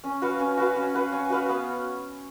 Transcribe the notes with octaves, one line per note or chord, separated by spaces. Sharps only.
C#4
F#4 B4 F5
C#4
F#4 B4 F5
C#4
F#4 B4 F5
C#4
F#4 B4 F5
B3